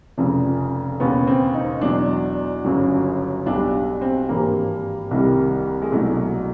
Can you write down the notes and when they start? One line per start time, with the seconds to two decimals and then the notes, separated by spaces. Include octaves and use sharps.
0.18 F1 F2 C#3 F3
1.00 E1 D#2 C#3 B3
1.27 C4
1.54 D#4
1.81 E2 B2 F#3 D4
2.65 G1 F#2 C#3 F#3
3.46 B1 B2 G3 D4
4.01 C4
4.29 G#1 G2 E3 G3 A#3
5.11 C2 C3 D#3 G3
5.82 G#3
5.92 C2 B2 F#3 A3